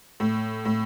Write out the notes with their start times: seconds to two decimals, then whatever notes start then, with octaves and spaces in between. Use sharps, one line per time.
0.20 A2
0.65 A2